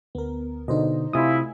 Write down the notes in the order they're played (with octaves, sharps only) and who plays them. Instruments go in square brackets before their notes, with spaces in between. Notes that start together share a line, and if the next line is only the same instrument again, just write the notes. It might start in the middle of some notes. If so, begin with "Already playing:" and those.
[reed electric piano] D2 [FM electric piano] B3 A#4
[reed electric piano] B2 D3 [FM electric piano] D#4 C5 D#5
[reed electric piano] C3 D#6 [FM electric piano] A3 G#5 [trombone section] E4 F4